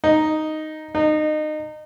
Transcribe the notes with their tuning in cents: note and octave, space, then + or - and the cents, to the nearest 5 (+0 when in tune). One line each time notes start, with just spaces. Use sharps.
D#4 +0
D#4 -25